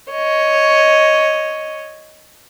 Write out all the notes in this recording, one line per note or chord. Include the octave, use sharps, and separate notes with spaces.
C#5 D#5